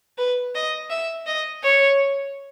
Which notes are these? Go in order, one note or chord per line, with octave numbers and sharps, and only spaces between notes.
B4
D#5
E5
D#5
C#5